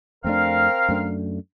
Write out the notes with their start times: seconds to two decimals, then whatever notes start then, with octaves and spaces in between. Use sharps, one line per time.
0.24 F2 A3 C4 D4 A#4 F5
0.89 F#2 A3 D4